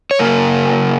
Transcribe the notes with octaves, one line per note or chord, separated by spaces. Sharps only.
C#5
F#2 C#3 A#3 A#4